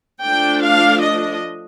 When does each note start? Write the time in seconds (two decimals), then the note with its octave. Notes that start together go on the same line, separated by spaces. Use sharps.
0.23 F3 A3 D4 G5
0.63 F5
1.02 D#5